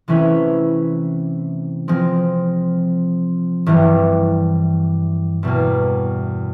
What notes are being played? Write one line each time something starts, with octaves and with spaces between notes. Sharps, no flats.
C3 E3 A3 C#4 E4
F3 G#3 C4
G2 E3 G3
E2 B2 G3 A#3